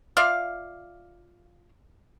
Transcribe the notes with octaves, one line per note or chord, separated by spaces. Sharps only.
F4 D5 E5 F5